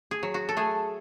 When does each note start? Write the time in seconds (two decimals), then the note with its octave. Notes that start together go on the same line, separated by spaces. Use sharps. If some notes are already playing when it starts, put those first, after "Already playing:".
0.11 G#4
0.23 F#3
0.34 F#4
0.49 A4
0.57 A3 G#4